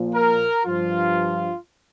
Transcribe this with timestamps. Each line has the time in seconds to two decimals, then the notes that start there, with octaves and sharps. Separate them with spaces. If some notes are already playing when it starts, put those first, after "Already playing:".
Already playing: A#2 F3
0.14 A#4
0.66 G2 F3 F4